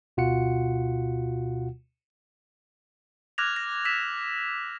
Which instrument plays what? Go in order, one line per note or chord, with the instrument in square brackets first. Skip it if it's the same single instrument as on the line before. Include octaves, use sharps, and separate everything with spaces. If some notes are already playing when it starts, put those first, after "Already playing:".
[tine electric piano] D2 B2 F4 F#4 F#5 C#7
[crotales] D6 F6 F#6 G#6 A#6 F7
A#6
E6 B6 E7